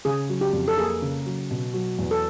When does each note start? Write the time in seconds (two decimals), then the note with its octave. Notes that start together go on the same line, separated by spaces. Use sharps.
0.05 C#3 G#4
0.29 F#3
0.41 G4
0.53 F2
0.68 A4
0.77 A#3 G#4
1.02 C#3
1.26 F#3
1.51 B2
1.74 F#3
1.99 E2
2.11 A4